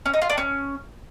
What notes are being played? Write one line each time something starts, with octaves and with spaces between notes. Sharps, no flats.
C#4
D#4
F4
D4
C#4